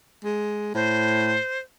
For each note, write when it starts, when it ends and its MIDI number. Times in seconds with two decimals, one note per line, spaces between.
0.24 0.71 56
0.74 1.38 45
0.74 1.58 72